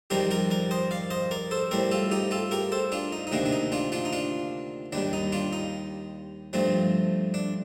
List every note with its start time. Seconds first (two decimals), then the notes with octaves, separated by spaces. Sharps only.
0.10 F2 D#3 G3 C4 G4 A#4
0.31 G4 A#4
0.50 A#4 D5
0.71 C5 D#5
0.91 D5 F5
1.11 C5 D#5
1.31 A#4 D5
1.51 A4 C5
1.71 A2 G3 C4 A#4 D5
1.91 F4 A4
2.11 D#4 G4
2.31 F4 A4
2.51 G4 A#4
2.72 A4 C5
2.92 D4 F4
3.12 D#4
3.27 D#4
3.32 D2 C3 D#3 A#3 D4
3.46 D4
3.52 D#4
3.72 D4 F4
3.92 D4 F4
4.05 D#4
4.13 D4 F4
4.93 D#2 D#3 G3 D4
5.13 D#4
5.32 D4 F4
5.53 D#4
6.53 G2 F3 A3 C4
7.34 D4